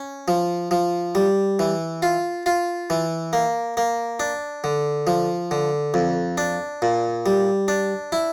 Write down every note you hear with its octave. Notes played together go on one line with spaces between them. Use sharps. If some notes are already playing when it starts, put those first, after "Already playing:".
Already playing: C#4
F3
F3
G3
E3
F4
F4
E3
A#3
A#3
D4
D3
F3
D3
F2
D4
A#2
G3
D4
E4